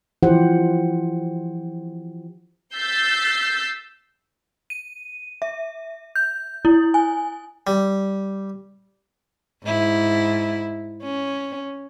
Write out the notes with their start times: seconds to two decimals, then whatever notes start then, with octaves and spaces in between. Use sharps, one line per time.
0.23 E3 F3 E4 G4 C5 F#5
2.75 E6 G6 A6 B6 C7
4.70 D#7
5.42 E5
6.16 G6
6.65 E4
6.94 G#5
7.67 G3
9.64 G#2 E4
11.03 C#4